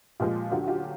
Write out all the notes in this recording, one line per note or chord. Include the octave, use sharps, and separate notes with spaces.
A#2 F3 G#3 F4 G4
D2 D3 F#3 F4 G4
F#4
F4 G4